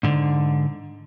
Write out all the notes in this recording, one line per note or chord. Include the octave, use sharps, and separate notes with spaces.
G#2 D3